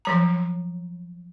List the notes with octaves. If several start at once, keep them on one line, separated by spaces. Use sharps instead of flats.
F3 F#3 A#5